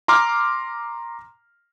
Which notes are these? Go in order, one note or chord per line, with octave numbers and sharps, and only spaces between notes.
A#5 C6 D6 F6